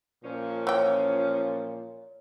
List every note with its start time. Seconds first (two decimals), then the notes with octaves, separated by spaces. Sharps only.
0.24 A#2 F3 C#4
0.67 E3 C#5 G5